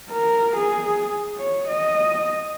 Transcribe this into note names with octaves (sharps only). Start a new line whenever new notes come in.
A#4
G#4
C#5
D#5